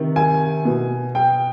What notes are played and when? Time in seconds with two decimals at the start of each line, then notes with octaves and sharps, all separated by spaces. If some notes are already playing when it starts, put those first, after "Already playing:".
Already playing: C3 D#3
0.16 G#5
0.65 B2
1.15 G5